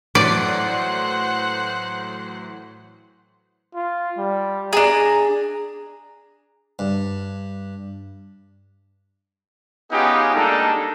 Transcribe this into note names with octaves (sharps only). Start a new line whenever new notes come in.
A2 E3 F#3 C5 D5 F#5
F4
G3
D4 G#4 A#5
G2
B3 C#4 D#4 F4 G4 G#4
G3 G#3 A#3 D4 D#4 A4